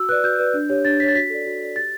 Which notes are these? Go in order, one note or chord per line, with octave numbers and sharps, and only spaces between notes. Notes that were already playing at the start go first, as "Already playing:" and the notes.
Already playing: F#4 E6
B4 D5 F#6
F#4 G6
B4 D5
D4
G4 C#5
D4 A6
G4 C#5 B6
A6
F#4 B6
A4 D5
F#4
A4 D5
G4 A6